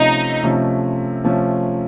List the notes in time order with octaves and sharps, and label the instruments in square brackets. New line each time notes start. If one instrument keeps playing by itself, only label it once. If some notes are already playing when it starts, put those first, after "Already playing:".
Already playing: [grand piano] C3 F3 A3 C#4 [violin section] D#4
[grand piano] C3 F3 A3 C#4
C3 F3 A3 C#4